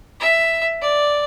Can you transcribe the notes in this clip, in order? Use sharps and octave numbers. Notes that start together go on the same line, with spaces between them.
E5
D5